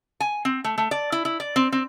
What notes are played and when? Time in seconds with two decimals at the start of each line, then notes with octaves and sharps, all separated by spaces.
0.20 G#5
0.45 C4
0.64 A3
0.78 A3
0.91 D5
1.12 E4
1.25 E4
1.40 D5
1.56 C4
1.72 C4